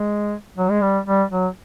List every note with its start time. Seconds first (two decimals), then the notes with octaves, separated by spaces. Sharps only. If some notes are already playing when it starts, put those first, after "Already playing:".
Already playing: G#3
0.58 F#3
0.70 G#3
0.82 G3
1.07 G3
1.31 F#3